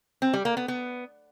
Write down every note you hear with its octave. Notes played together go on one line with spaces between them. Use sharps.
C4
G3
A#3
B3
B3